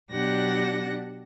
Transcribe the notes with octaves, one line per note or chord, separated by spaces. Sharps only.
B2 F#3 D4 G4 F#5 A#6